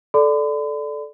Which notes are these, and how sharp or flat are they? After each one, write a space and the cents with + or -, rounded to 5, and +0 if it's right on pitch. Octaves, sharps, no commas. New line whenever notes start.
A4 -15 D5 +0 B5 +45